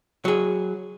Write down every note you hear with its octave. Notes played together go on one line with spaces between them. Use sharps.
F#3 G#4